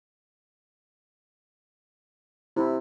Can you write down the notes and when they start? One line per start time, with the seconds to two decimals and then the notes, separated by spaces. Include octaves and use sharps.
2.56 C3 E4